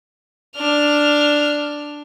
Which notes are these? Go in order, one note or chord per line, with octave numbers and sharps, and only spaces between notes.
D4 F6